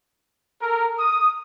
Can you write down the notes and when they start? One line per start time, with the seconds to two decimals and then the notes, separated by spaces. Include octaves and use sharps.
0.60 A4 A#4
0.98 D#6